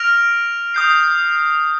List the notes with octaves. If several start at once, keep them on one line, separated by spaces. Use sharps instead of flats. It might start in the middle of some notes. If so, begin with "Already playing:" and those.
Already playing: F6 A#6 D7 F7
D#6 G6 C7